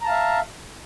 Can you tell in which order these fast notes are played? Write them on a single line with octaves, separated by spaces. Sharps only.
A#5 A5 F5 E5